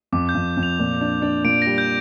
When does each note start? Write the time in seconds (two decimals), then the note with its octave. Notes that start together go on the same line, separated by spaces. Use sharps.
0.12 F2 D6
0.29 G6
0.35 F2
0.57 F2
0.63 F7
0.79 A#2
1.01 D4
1.22 D4
1.44 A#2 D7
1.62 G3 A#6
1.78 G6